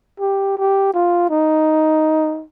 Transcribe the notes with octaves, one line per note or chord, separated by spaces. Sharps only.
G4
G4
F4
D#4